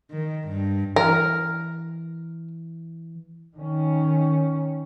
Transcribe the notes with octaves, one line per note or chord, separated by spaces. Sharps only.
D#3
G2
E3 A#4
D#3 C#4